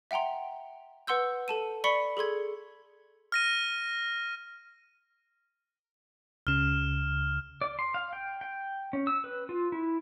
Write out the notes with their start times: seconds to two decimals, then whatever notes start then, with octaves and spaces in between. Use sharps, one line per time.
0.11 E5 F#5 G5 A#5 C6
1.07 B4 F#5 C6 E6 G6
1.48 A4 A5 D#7
1.84 D5 B5 C#6 B6 C#7 G7
2.17 G#4 A4 C6 G#6
3.32 F6 A#6 D#7
6.47 C#2 C#3 F6 E7
7.61 D5
7.79 C6
7.94 F5
8.13 G5
8.41 G5
8.93 C#4
9.07 E6
9.24 B4
9.49 F4
9.72 E4